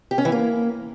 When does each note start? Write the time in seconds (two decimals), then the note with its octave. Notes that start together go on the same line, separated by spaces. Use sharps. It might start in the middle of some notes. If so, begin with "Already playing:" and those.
0.11 G4
0.18 C#4
0.25 E3
0.32 A#3